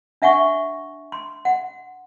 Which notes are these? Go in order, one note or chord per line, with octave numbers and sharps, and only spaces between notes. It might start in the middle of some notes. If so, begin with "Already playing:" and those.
D4 E5 F#5 G#5 C#6
C6
F#5